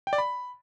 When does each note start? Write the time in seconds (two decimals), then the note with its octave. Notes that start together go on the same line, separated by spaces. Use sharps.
0.07 G5
0.13 D5
0.18 B5